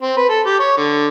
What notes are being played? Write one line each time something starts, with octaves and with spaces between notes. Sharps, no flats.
C4
B4
A4
G4
C#5
D3